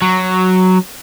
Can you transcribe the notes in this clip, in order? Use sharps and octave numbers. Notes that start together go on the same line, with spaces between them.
F#3